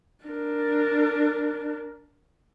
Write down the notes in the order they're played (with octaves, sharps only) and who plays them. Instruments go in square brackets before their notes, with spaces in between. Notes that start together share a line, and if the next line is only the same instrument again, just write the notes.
[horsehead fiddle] D4 A#4